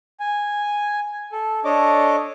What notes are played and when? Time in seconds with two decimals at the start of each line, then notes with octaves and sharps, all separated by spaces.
0.20 G#5
1.32 A4
1.65 D4 A4 C#5 D#5 D6